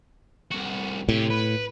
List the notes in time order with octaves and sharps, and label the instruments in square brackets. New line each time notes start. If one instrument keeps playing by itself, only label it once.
[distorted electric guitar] C2 F#4
[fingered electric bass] A2 [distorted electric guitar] C3 G4
[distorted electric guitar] B4